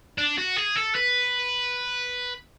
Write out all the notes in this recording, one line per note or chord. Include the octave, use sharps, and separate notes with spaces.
D4
F#4
G#4
A4
B4